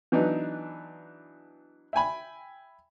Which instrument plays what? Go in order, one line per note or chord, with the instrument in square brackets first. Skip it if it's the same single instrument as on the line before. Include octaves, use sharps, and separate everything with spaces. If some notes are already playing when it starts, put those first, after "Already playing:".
[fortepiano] E3 F#3 B3 D4 D#4
E5 G5 G#5 B5